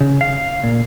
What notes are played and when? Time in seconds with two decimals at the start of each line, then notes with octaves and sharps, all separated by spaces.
0.01 C#3
0.21 F5
0.64 A#2